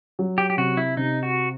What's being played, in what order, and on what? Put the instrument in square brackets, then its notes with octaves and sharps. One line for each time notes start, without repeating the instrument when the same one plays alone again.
[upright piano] F#3
[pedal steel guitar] G4
G4
[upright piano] C3 [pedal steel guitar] F#4
[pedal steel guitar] E4
[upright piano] C3 [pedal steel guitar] D#4
[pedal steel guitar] F#4